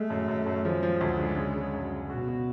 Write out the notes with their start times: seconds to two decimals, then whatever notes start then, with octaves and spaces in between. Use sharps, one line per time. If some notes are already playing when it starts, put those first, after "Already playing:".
Already playing: G#3 A3
0.10 F#2
0.28 F#2
0.46 F#2
0.65 F3 G#3
0.83 F3
1.01 D2
1.19 D3
1.37 C#3
1.56 C#3
1.73 F#2
1.92 C#3
2.10 B2 F#4
2.28 F#4